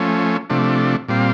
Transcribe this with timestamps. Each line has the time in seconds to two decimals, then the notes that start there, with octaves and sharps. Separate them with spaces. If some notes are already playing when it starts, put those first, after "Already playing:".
Already playing: F3 A3 C#4
0.50 C3 F3 A3 D4
1.08 A#2 G3 C4 F4